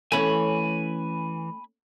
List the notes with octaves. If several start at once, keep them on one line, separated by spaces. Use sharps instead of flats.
E3 A3 C#4 G#5 B5